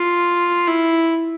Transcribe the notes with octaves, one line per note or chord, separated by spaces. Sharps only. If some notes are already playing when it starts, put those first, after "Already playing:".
Already playing: F4
E4